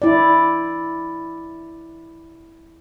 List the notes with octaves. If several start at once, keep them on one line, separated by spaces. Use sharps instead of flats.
E4 D5